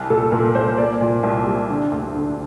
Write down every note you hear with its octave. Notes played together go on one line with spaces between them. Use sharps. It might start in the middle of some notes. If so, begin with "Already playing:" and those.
Already playing: C2
A#2 A4
A#2 A#4
C2 C5
A#3 D5
A#2
C2
G3
D3
D2
D3